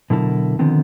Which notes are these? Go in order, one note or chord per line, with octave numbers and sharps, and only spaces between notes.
B2 D3 F#3 E4 A#4 A5
D3 D#3 F3 B3 C4